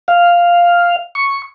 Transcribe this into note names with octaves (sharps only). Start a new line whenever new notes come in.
F5
C#6